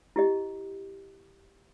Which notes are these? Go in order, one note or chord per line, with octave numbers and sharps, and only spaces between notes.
E4 G4 D#5